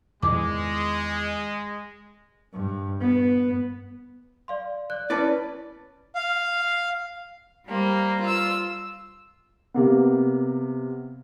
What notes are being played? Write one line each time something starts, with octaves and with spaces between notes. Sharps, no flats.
E2 D#3 E3 G#3 D6
G2
B3
D5 F5 C6
D5 F#6
C#4 E4 B4 D5 A5
F5
G3 A#3 C5
F4 E6
C3 A#3 B3